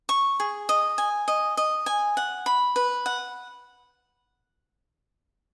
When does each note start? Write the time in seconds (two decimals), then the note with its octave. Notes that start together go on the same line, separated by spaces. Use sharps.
0.09 C#6
0.40 G#4
0.69 D#5
0.98 G#5
1.28 D#5
1.57 D#5
1.86 G#5
2.17 F#5
2.46 B5
2.76 B4
3.06 F#5